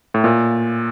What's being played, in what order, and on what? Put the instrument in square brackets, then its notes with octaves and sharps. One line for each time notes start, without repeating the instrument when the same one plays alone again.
[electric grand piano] A2
A#2